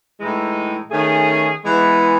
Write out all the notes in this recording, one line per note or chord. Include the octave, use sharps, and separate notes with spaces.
A2 E3 G#3 D#4
D#3 A3 C#4 G#4
E3 G#3 B3